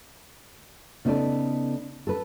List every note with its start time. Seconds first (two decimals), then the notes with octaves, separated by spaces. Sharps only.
1.05 C#3 B3 D#4 A4 D5
2.07 A4 B4